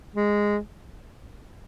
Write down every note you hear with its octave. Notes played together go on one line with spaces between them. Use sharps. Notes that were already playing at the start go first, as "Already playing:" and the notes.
G#3